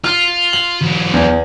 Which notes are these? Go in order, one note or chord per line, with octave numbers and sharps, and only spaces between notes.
F4 F6
F#7
E3 F#3
E2